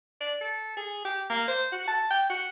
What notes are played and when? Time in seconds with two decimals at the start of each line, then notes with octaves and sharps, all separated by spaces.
0.21 D5
0.41 A4
0.77 G#4
1.05 G4
1.30 A#3
1.48 C5
1.72 F#4
1.88 A5
2.11 G5
2.30 F#4